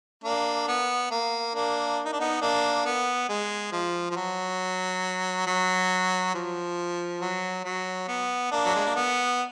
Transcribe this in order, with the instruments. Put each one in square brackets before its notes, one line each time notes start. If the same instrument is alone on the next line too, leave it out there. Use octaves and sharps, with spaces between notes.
[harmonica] A#3 D4
B3
A#3
A#3 D4
D#4
D4
B3 D#4
A#3 D4
B3
G#3
F3
F3
F#3
F#3
F3
F#3
F#3
B3
A#3 D4
F#3
G#3
A#3
B3